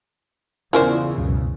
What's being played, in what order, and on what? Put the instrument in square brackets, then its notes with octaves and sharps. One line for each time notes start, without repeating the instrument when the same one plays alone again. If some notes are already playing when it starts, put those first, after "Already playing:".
[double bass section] E2 C#3 [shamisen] C#4 A#4 C5 [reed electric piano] E4 F4 D5
[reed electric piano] C#2 F#2 B2